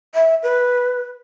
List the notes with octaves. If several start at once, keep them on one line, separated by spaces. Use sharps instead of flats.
E5
B4